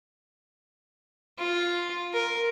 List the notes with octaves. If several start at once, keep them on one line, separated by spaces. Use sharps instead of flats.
F4
A#4